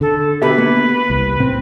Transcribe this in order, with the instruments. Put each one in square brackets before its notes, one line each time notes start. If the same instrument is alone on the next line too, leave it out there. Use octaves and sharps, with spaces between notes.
[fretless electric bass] D3 [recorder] A4
[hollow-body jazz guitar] B2 G4 E5 [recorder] B4
[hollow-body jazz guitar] A#3 B3
[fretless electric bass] C2
A2 C4